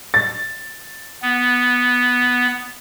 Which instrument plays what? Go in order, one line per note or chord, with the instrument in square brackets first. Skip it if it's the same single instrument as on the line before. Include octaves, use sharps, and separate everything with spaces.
[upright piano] A6
[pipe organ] B3